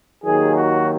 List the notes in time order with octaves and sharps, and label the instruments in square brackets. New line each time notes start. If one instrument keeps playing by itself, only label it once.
[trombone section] D#2 D#3 F#3 G#4
F#4